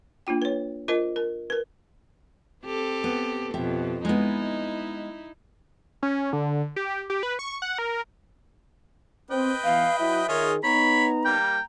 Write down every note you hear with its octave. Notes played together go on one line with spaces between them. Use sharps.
A#3 D4 F4 G5
B4 C#5
F4 A#4 C5 D#5
A#4
A#4 B4
C4 G4 A4
B3
F2 B2 G4 E5
G#3 B3 D#4 E4
C#4
D3
G4
G4
B4
C#6
F#5
A#4
C4 B4 D#5 G5
E3 B3 F5
F#3 E4 E5
D#3 F4 G#4 A#4 C#5 D#5 G#5
B3 D#4 C#5 A#5 B5
G3 A#3 G5